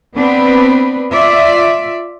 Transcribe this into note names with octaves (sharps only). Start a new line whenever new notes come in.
B3 C4 D4 B4
F4 D5 E5